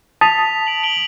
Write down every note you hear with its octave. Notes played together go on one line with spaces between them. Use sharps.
A5 D#6 B6 F7
D7 F#7
D7 F#7 G7